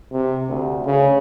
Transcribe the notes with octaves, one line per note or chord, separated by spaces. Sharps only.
C3
D2
C#3